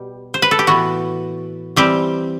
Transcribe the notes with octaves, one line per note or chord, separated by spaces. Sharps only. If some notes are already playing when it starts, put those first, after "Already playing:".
Already playing: B2 G3 G4
C5
B4
A4
G4
A2 E3 B3 F#4
E3 G3 C4 G4